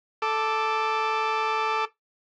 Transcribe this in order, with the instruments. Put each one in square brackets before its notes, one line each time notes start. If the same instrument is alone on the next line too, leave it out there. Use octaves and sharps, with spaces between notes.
[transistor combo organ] A4 D6